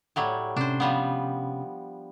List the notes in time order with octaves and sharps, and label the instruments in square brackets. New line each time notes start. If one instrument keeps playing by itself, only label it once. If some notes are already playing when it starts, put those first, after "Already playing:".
[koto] A2 F#3 G3
[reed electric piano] C3 C#4 [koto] D4 C5
[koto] F3 G3 B3